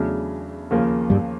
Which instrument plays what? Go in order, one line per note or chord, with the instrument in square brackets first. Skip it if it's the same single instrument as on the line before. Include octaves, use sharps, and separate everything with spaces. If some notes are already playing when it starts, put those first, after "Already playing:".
Already playing: [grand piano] E2 C#3 F#3 A3 D4
D#2 C#3 F3 A#3
[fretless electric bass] G2 G3